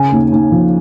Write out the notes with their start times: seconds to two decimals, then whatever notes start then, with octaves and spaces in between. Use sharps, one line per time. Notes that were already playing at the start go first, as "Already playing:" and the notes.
Already playing: C#3 G#5
0.12 D#2
0.32 D#2
0.52 F3